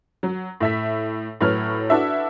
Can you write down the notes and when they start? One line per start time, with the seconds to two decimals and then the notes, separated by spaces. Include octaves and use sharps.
0.23 F#3
0.60 A2 E5 B6
1.41 A2 F#3 B4 C#5 F6
1.90 D4 E4 F#4 A4 B4 E5